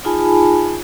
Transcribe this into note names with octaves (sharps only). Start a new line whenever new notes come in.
D#4 F4 G#4 G#5 A5 B5